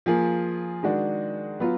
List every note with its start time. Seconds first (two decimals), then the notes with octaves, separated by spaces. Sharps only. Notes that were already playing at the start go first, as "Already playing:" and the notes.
0.06 F3 A#3 F4 G#4
0.83 D#3 G#3 D4 F#4
1.60 F#3 B3 F4